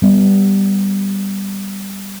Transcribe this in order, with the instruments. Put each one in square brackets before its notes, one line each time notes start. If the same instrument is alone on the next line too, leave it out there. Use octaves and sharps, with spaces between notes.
[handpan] G3 B3